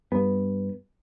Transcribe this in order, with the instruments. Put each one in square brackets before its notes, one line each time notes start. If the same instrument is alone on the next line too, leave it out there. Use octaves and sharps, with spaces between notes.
[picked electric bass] G2 B3